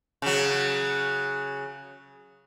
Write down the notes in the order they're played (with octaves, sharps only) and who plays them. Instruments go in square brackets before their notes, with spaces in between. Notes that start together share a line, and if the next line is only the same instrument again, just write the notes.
[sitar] C#3 F#3